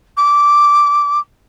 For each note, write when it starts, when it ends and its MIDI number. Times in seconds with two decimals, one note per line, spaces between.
0.17 1.19 86